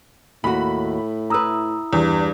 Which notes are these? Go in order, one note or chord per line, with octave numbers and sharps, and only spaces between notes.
D#2 A2 F#4 B5
E4 B4 A#5 D#6 E6
E2 G2